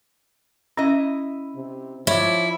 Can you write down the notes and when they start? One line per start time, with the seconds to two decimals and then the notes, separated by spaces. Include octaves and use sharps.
0.77 C#4 E4 D#5
1.56 C3
2.07 F3 E4 C#5 D5